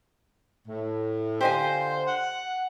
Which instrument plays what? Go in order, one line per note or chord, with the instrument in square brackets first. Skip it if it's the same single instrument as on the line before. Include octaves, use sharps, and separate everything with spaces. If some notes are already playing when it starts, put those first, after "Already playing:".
[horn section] A2
[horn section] D3 F4 C5 [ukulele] G4 D#5 G#5
[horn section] F#5